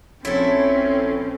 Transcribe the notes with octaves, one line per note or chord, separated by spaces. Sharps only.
A#1 C4 C#4 E4 A4 C#5